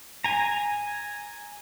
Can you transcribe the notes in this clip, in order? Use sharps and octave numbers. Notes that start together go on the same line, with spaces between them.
G#5 A#5